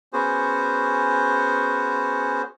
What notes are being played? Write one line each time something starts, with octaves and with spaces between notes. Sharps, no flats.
B3 C#4 F#4 G#4 C5